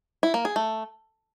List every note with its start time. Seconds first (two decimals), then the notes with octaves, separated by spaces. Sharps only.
0.23 E4
0.34 A#3
0.45 G#4
0.56 A3